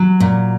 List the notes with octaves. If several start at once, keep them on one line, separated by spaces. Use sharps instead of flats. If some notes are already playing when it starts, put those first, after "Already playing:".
Already playing: F#3
A#2